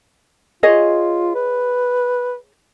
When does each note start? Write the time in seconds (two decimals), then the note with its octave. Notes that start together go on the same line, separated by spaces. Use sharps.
0.63 F4 G#4 C#5 D#5
1.35 B4